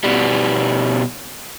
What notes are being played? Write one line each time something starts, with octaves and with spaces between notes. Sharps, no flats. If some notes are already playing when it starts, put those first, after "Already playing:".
B2 G3